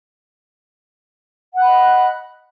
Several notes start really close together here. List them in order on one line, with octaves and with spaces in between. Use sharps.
F#5 F#6 B5 D#5